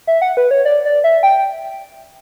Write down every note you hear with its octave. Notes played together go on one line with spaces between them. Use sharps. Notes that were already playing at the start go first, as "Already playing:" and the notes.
E5
F#5
B4
C#5
D5
D5
E5
G5